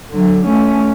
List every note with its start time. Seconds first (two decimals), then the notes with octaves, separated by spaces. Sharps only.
0.13 D3 F#3
0.45 A3 C#4